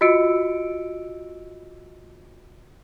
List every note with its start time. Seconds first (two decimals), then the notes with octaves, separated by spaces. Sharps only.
0.01 F4 F#4 D#5 E6 C#7 D7